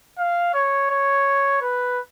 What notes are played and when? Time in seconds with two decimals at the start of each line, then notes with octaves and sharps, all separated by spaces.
0.18 F5
0.54 C#5
0.91 C#5
1.62 B4